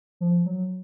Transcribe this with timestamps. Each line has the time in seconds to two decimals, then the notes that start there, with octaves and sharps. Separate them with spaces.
0.20 F3
0.46 F#3